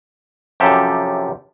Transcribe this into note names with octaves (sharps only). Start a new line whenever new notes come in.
F#2 C3 F3 G4 A4 E5